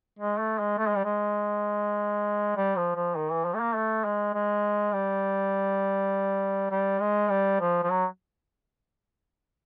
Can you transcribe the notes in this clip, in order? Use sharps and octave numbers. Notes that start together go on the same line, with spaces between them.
G#3
A3
G#3
A3
G#3
G3
G#3
G3
F3
F3
D#3
E3
F3
A3
A#3
A3
G#3
G#3
G3
G3
G#3
G3
F3
F3
F#3